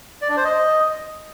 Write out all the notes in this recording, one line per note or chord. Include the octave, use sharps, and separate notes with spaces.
D5
D4
C5
D#5